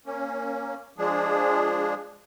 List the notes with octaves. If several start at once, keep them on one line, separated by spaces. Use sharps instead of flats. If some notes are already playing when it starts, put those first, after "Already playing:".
A#3 C#4
F3 G#3 D4 G#4